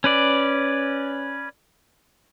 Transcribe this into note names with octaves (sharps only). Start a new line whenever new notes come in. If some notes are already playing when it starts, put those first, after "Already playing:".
C#4 B4 D5